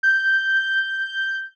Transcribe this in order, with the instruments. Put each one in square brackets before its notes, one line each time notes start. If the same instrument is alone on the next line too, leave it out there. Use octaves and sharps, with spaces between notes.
[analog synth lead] G6